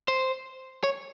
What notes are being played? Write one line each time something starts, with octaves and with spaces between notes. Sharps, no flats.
C5
C#5